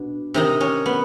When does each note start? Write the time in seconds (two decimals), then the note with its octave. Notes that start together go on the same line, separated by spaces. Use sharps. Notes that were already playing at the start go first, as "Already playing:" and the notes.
Already playing: B2 D4
0.34 C3 D#3 D#4
0.60 C#4
0.86 B3